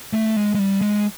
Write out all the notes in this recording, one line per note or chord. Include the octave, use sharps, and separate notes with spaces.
A3
G#3
G#3
G3
G#3